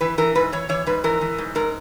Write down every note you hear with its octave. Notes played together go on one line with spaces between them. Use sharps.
E3 B4
E3 A#4
G#2 B4
E3 C#5
E3 C#5
G#2 B4
E3 A#4
E3
G#2
G#2 A#4